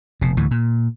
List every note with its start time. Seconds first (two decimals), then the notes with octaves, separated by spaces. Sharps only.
0.21 F1 B2
0.37 D2 A2 E3
0.51 A#2